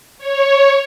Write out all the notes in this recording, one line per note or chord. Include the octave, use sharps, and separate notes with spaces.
C#5